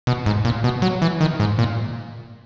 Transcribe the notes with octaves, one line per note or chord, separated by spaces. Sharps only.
B2
G#2
A#2
B2
F#3
E3
D#3
G#2
A#2